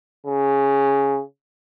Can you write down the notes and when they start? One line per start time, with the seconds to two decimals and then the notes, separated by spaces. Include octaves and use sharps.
0.27 C#3